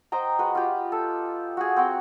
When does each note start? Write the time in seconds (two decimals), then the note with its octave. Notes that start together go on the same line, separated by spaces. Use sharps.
0.12 C5 D#5 G5 A#5
0.39 G#3 F#4 B4
0.55 F4 G4
0.92 A4
1.57 F#4 G#4
1.76 C4 F#4 G5